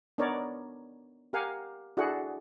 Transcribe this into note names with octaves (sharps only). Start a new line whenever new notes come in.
B3 D4 D#4 A#4 C#5 D5
G4 A#4 F5 F#5 G#5
D4 E4 F#4 G#4 A4 F#5